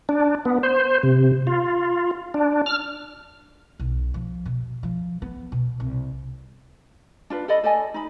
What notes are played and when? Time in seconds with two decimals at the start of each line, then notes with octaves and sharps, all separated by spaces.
0.09 D4
0.45 B3
0.63 C5
1.03 C3
1.47 F4
2.34 D4
2.66 F6
3.80 B1
4.14 F3
4.46 B2
4.83 F3
5.22 B3
5.52 B2
5.80 C2
7.30 D4 F4 B4
7.48 A4 D5 D#5 B5
7.63 A4 D5 D#5 G#5
7.94 D#4 B5